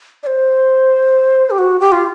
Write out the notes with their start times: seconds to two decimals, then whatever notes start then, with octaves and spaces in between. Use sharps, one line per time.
0.23 D5
0.27 C5
1.51 G4
1.58 F#4
1.80 G4
1.92 F4